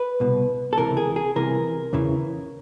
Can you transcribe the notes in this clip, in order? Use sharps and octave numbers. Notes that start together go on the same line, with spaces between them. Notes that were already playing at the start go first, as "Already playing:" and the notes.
Already playing: B4
C2 B2
A4
C#2 C3 E3 A#4
G#4
G#4
C2 C3 E3 A#4
E2 C#3 E3